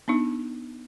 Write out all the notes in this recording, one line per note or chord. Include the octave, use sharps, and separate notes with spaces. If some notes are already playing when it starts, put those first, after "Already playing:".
B3 D4 D#4